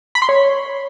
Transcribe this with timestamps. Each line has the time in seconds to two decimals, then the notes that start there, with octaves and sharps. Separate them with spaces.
0.15 B5
0.22 C6
0.29 C#5